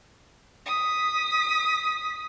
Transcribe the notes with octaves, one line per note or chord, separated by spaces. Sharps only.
D#6 B6